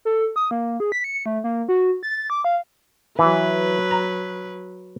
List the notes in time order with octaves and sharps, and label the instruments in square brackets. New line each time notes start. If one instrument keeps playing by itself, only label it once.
[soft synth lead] A4
D#6
A#3
G#4
B6
C#7
A3
A#3
F#4
A6
D6
F5
[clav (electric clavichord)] E3 [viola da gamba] F#3 B4
[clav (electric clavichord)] A#5